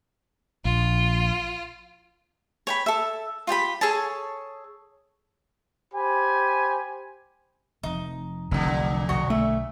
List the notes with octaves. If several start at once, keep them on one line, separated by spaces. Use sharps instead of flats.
A#1 F4
C#5 G5 B5
A4 E5
F4 G4 G5 B5
G#4 A4 C#5 A5
G4 C5 G#5 B5
F1 F2 D#4
F1 C2 F2 A#2 D3 F#3
B1 F#4 C#5 D#5
A3 E5